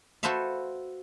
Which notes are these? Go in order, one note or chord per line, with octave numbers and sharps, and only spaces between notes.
F#4 A4 B4 C5 E5 F5